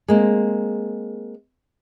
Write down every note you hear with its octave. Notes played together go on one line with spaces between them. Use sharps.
G#3 A#3 C4